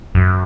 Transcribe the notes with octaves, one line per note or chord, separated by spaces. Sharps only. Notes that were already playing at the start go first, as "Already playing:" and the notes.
F#2